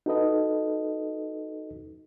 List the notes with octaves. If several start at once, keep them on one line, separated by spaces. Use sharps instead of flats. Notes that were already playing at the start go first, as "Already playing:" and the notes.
D#4 F#4 A4 B4 D#5